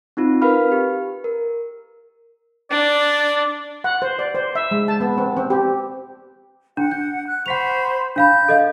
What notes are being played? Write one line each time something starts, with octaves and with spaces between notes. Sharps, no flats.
C4 D#4 F4
A#4 B4 F5 B5 F6
G4
A#4
D4 D5
F#5
C5
D5
C5
E5
G#3
A5
B3
C4
C4
G4
D4 F#5
G6
F#6
C5 F#5 B5 C#6 B6 F7
D4 F5 B5 G6
A4 D#5 F5